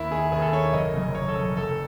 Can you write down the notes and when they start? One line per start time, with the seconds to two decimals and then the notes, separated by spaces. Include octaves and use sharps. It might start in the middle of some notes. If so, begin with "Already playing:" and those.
Already playing: D#2 E4
0.11 D#3 G#4
0.32 D#2 G#4
0.42 A4
0.52 D#3 C#5
0.73 F#1 D#5
0.94 F#2 C#3
1.15 F#1 C#5
1.28 A4
1.35 F#2 C#3
1.57 F#1 A4